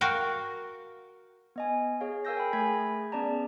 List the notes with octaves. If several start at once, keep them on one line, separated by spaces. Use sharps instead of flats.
F#4 A#4 F5 G5
B3 D#5 G#5
G#4 C#5 F5
A#4 F5 G#5 E6 G6 A#6
G5 B5
A3 G#4 G#5 B5 G#6 B6
B3 C#4 G#4 D5 A5 A#5